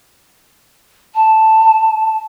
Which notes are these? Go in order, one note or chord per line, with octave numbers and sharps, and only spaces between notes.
A5